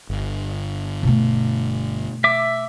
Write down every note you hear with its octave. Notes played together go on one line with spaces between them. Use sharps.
G1
B2 A3
E5 D6